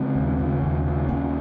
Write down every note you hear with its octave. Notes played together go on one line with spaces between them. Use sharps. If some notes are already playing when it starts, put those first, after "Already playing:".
Already playing: C#3 G#3 C4
D#2
C#3
D#2
C#3
D#2 A#3 C#4